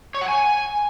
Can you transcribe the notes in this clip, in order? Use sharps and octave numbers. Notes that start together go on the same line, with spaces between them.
C#5
F#5
G#5